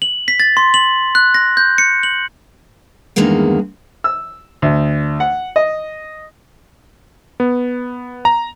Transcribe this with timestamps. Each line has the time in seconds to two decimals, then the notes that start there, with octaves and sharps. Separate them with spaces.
0.02 F#7
0.28 B6
0.40 A6
0.57 C6
0.74 F#7
1.15 F#6
1.34 A#6
1.57 G6
1.78 C#7
2.03 F#7
3.16 E2 G2 D#3 G#3 A#3 F#5
4.04 E6
4.62 D2
5.20 F#5
5.56 D#5
7.40 B3
8.25 A#5